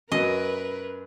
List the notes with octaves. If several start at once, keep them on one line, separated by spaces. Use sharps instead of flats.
F#2 F#3 A#4 B4 D#5